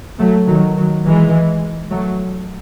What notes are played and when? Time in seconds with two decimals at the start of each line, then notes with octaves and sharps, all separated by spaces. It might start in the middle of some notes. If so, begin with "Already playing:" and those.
0.19 F#3 A3
0.48 D#3 F#3
0.76 D#3 F#3
1.05 E3 G#3
1.91 F#3 A3